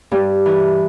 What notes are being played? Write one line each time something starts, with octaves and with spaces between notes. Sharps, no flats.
G2 G3
E3